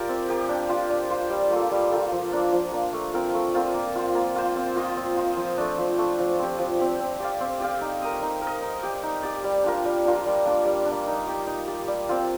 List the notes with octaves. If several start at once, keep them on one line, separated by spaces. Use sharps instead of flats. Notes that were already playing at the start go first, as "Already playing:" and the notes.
Already playing: F4 G4 A#4 D5
C4
G4 A#4 D5
D4
F4 C5
D4
F4 C5
G3
A#3 F4 A4
G3
A#3 F4 A4
F3
A#3 D4
F3
A#3 D4
A3
C4 F4 A#4
A3
C4 F4 A#4
A#3
F4 C5
A#3
F4 C5
C4
F4 C5 D#5
C4
F4 C5 D#5
F3
A3 D4
F3
A3 D4
F3
C4 G4
F3
C4 G4
C4
G4 D5 F5
C4
G4 D5 F5
D#4
A#4 D#5
D#4
A#4
D#5
D#4
G4 D5
D#4
G4 D5
G3
D4 F4 A#4
G3
D4 F4 A#4
G3
A#3 D4
G3
A#3 D4
D#4
G4 D5
D#4
G4 D5
G3
C4 F4